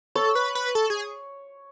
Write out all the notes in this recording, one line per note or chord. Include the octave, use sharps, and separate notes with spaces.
A4 C#5
B4
B4
A4
G#4